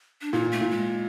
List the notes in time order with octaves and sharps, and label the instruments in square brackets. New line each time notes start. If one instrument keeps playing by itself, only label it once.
[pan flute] D4
[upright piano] A#2 [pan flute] D#4
[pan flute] A3
[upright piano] A#2
[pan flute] G#3